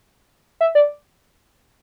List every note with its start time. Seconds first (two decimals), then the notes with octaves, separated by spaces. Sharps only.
0.61 E5
0.75 D5